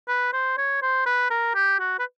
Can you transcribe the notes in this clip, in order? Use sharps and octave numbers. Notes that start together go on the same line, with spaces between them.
B4
C5
C#5
C5
B4
A#4
G4
F#4
B4